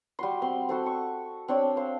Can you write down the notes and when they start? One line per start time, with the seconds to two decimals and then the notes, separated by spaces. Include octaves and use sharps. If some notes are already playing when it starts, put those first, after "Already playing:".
0.19 G3 F#4 C6
0.42 C4 C6
0.69 F#4 A4 C5
0.86 C#6
1.48 C4 D4 C#5 D5
1.76 C5 F5